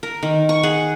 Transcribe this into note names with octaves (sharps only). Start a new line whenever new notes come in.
A#4
D#3
C#6
G#4 F#5